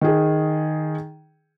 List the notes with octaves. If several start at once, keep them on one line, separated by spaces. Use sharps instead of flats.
D#3 G#4